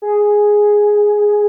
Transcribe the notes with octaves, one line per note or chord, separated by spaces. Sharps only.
G#4